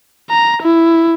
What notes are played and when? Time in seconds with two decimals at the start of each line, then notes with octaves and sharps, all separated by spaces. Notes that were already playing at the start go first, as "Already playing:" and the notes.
0.30 A#5
0.63 E4